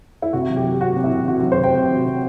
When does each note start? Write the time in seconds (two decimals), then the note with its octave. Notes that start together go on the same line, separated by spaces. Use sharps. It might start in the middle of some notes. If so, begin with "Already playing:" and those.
0.22 E4
0.33 C3 F#4
0.49 F#3
0.57 G4
0.65 F#3
0.81 C3 F#4
0.96 C3
1.04 E4
1.12 C3
1.28 F#3 F#4
1.40 F#4
1.43 F#3
1.52 C5
1.59 C3 G5
1.75 C3
1.91 F#3
2.07 C3